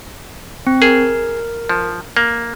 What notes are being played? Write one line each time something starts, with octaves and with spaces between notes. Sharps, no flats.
C4
G#4 A#4
F3
A#3